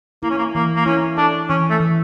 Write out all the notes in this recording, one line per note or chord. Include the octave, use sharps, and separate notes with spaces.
A#3 E4
C#4
A#3
E3 A#3
A#3
C#4 E4
D4 A4
E3 C#4
A3
E3